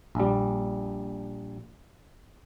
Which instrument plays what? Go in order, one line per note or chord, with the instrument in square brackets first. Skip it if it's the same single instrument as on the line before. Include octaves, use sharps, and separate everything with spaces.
[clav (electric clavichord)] A#1 G3